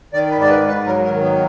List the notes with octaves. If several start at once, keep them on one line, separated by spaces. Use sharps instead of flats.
D#3 D5
B4
G#2 D5
B4
G#2
B4
F#3 A#4
A#4
D#3
B3